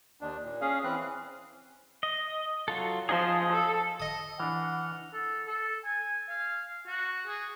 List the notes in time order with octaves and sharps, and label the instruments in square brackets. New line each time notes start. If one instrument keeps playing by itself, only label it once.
[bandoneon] D#2 D4
A#2
C#4 G#4 F5
E3 C4 B4 F#6
[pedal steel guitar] D#5
F#3 F4 A4
[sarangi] F3 [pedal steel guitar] G#4 D#5 A5
[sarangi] A4
[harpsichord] D#5 D#6
[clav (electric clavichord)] E3 D4 [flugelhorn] F#5 [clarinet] F6
[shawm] A4
A4
G#5
F5
F#4
G#4